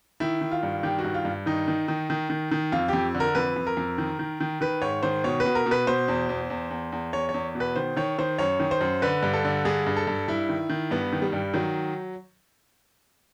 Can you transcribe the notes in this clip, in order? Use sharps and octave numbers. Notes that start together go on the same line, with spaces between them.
D#3 E4
D#3
F4
G2
D#3 G4
F#4
G2
F4
G2
D#3 D#4
D#3
D#3
D#3
D#3
D#3
F2 F4
F2 G4
D3
A#4
F2 B4
F2
A#4
F2
D#3
D#3
D#3
D#3 B4
G#2 C#5
D#3 C5
B2 C#5
B2 B4
A#4
B2
B4
B2 C5
E2
E2
E2
E2
E2
E2 C#5
C#5
E2
B2
B4
D#3 C5
D#3 C#5
D#3 C5
F#2 C#5
D#3
C5
F#2
D3 B4
G2
A4
D3
G2 G#4
G2
A4
G2
G2 E4
D#3
D#3
G2 B3
D#3
G3
G2
D#3 F#3